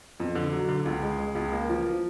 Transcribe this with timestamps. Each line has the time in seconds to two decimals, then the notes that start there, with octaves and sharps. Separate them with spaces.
0.20 F2
0.35 D3
0.52 F#3
0.68 D3
0.85 C#2
1.02 G#3
1.19 G#3
1.35 C#2
1.52 A#3
1.69 F3
1.86 F3